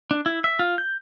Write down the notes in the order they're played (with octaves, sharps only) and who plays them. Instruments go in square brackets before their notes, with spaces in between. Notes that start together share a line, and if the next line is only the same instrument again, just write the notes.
[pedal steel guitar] D4
E4
E5
F4
G6